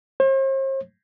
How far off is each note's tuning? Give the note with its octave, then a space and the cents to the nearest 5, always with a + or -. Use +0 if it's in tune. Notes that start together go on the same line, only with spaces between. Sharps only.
C5 +45